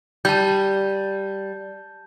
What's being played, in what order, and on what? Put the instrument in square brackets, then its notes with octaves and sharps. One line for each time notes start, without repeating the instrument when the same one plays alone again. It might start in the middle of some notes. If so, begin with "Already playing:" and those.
[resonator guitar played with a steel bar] G3 [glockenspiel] A5 G6